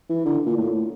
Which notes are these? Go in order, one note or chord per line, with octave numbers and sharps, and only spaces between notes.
E3
D3
A#2
A2